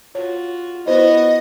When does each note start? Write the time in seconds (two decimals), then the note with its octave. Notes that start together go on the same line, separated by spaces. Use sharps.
0.15 F4 F#4 C#5
0.86 B3 E4 F#4 C5 D#5